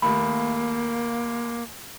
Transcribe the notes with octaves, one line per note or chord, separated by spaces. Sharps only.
D#2 A3 A#3 B5